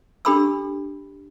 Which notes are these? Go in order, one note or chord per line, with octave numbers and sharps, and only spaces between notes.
D4 G4 A4 B5 C6 E6